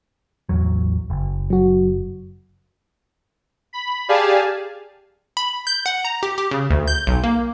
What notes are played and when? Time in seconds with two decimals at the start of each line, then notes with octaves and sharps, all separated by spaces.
0.49 A1 E2 F#3
1.10 F#1
1.50 F#3 F#4
3.73 B5
4.09 G4 G#4 D5 F5 G#5 A5
5.37 B5
5.67 G6
5.86 F#5
6.05 A#5
6.23 G4
6.38 G4
6.51 C#3
6.70 D2
6.88 G6
7.07 B1
7.24 A#3